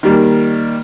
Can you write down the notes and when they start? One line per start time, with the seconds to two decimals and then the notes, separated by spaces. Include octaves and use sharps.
0.03 D#3 G3 A#3